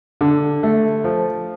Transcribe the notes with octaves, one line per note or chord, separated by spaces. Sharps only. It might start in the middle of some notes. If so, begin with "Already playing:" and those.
D3
A3
F3